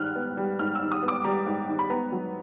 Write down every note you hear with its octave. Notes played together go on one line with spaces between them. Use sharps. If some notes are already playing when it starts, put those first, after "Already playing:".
Already playing: G#2 D#3 G3 F6 F#6
B3
G3
G#2 F6
E6
D#3
D#6
B3
D6
G3 A#5
G#2
D#3
B5
B3 A#5
F#3